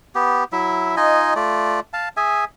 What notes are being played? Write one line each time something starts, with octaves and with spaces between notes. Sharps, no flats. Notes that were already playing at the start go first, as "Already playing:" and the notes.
B3 G4
F#3 E4 E5
D#4 F4 D#5 G#5
A3 F4 D5
F5 A5
G#4 E5 G#5